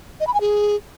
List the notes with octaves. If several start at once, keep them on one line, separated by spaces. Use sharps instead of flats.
D#5
B5
G#5
G#4